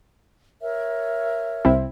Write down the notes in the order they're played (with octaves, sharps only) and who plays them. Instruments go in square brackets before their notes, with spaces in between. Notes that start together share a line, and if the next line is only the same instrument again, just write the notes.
[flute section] A#4 C#5 E5
[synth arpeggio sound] C2 C4 E4